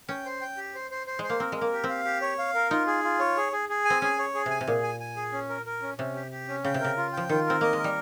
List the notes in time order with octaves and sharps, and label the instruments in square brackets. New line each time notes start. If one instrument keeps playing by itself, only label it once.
[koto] C#4 [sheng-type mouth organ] G5
[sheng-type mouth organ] C5
G5
G4
C5
C5
C5
[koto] G#3 [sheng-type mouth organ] C5
[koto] A#3
[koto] C4 [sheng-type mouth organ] A#4
[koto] G#3 [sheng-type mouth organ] A#4
[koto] A#3
[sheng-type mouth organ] G4
[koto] C4
[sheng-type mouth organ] F5
G4
C#5
F5
A#4
[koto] D#4 [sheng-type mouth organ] F4
[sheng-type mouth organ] G#4
F4
C#5
G#4
G#4
G#4
G#5
[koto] C4
[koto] C#4 [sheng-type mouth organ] G#4
[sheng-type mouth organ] C#5
G#4
[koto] C3 [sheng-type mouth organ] G#5
[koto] C3
[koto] A#2 [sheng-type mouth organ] G#4
[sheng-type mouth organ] G#5
G#5
G#4
C#4
A#4
A#4
C#4
[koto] C3 [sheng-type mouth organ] C#4
[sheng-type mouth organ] G4
G4
C#4
[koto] C#3 [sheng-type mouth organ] G5
[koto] C3
[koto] C#3 [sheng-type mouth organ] A#4
[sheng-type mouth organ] F4
[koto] F3 [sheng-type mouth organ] G5
[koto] D#3 [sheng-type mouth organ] F4
[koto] C4 [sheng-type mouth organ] A#4
[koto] A#3 [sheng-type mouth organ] D#5
[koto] G#3
[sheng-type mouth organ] A#4
[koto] G3